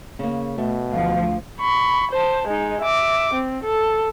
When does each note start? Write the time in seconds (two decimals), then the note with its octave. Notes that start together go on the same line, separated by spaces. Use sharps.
0.19 C#3 A#3
0.58 B2 A3
0.92 D2 F3 F5
1.60 B5 C#6
2.11 C5 A5
2.47 G#3 D#4
2.82 E5 D6
3.34 C4
3.63 A4